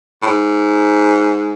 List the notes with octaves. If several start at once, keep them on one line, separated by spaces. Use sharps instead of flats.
A2
G#2